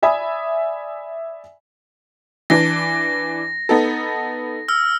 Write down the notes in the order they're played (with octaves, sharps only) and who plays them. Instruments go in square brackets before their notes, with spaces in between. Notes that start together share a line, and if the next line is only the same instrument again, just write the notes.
[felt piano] D5 E5 G#5 B5 D#6
[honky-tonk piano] E3 D4 [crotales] A#6
[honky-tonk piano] B3 D#4 A4
[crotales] E6 F6